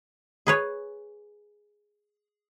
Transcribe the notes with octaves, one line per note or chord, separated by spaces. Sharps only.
G#4 B4 C#5